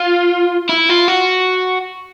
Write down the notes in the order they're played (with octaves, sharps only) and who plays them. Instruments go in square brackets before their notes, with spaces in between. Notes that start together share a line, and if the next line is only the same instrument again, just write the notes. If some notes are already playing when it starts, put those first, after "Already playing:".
Already playing: [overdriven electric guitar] F4
E4
F4
F#4